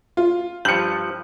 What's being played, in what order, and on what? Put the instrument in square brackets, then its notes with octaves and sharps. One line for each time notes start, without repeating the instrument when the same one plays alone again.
[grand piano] F4
[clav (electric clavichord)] G2 F3 [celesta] G6 [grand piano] C#7 F#7